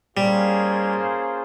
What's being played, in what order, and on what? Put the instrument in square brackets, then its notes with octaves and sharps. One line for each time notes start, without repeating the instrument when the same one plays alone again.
[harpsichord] G3 [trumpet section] A#3 C#4 F4 G#4 C5